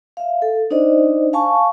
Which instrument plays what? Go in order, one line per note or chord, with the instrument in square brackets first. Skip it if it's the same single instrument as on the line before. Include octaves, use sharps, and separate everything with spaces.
[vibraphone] E5 F5
A4
D4 D#4 C5 D5 D#5
F5 G#5 A5 C#6